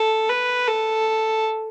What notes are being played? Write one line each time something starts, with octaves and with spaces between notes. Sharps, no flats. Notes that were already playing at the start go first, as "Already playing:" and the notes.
Already playing: A4
B4
A4